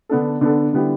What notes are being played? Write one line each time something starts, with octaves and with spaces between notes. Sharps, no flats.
D3 B3 D4 A4
D3 B3 D4 A4
D3 G3 B3 E4 G4